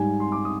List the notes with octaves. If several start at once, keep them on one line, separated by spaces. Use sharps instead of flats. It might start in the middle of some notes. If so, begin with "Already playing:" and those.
Already playing: G#2 G3 G#5
C6
D6
D#6